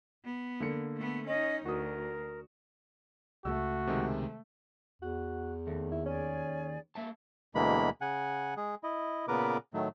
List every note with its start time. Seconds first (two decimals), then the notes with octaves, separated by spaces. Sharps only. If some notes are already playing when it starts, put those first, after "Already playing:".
0.24 B3
0.60 D3 A#3 C#7
0.97 A3 B3
1.27 C#4 D#4 D#5
1.65 D2 F#4 A#4 D#6
3.45 C#2 A3 F#4 E6
3.87 C3 D#3 G#3
5.02 E2 F#4
5.67 D#2 A3
5.92 E4
6.06 C#4 G#4 D5 G#5
6.95 A#3 E5 A5
7.55 D2 B2 E3 G#3 A#3 B5
8.01 C#3 F#5 G#5
8.57 G#3 G#4
8.83 E4 D#5
9.28 A#2 C#3 B3 A#4 B4 D6
9.74 A2 D#3 F#3 A3